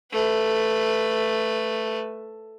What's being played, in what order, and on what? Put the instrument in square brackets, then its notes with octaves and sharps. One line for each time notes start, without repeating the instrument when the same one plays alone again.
[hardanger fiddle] A3 B4